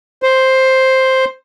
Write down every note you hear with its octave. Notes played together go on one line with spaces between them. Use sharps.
C5